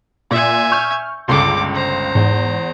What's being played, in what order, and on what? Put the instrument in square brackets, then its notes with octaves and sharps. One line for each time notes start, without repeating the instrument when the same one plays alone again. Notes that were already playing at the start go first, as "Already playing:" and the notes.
[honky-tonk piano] A#2 [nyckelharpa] E5 G#5
[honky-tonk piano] C#6 G6 [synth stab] F6
[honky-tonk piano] G1 C#2 C#3 [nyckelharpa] A4 D6 [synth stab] C6
[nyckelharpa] C5 A#5
[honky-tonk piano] E2 [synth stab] G#2